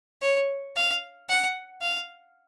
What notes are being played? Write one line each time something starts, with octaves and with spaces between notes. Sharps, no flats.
C#5
F5
F#5
F5